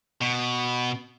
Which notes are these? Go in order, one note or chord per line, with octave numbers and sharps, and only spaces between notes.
B2